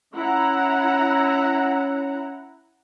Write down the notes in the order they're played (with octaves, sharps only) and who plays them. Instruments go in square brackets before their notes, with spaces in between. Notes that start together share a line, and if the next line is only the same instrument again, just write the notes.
[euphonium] C#4 [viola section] E4 F#5 A#5